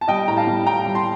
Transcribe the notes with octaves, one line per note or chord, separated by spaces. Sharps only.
A5
G3 D#5 G5
A2 A#5
F5 A5
G3
A2 G5 A#5
G3
A5 C6